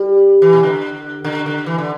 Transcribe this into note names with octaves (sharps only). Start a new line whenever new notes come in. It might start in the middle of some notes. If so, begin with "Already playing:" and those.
Already playing: G3
E3
B2
D3
D3
D3
E3
D3